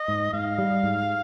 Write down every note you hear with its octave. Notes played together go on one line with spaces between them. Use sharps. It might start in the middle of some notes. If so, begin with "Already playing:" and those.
Already playing: D#5
G#2
G#2 F5
G3
G#2